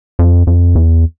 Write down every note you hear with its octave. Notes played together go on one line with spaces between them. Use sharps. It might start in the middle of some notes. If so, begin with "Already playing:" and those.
F2
F2
E2